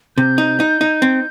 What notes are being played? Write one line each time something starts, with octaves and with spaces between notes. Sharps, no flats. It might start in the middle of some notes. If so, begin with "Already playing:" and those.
C3 G6
D#4
D#4
D#4
C4